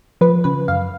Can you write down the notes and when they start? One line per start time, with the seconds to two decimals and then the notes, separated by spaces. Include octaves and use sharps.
0.21 F3 B4
0.44 C#3 B4
0.68 F#2 F5